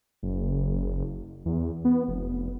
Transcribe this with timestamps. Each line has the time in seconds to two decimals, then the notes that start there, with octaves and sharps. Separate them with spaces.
0.23 F#1
1.46 E2
1.85 B3
2.08 F1